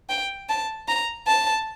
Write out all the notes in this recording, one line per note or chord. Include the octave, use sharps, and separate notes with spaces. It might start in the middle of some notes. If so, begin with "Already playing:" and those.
G5
A5
A#5
A5